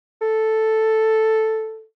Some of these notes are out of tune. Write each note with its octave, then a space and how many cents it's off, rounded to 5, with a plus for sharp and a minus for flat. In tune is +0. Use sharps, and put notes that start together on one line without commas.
A4 +0